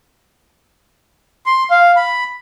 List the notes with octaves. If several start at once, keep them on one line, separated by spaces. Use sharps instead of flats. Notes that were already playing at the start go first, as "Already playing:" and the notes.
C6
F5
B5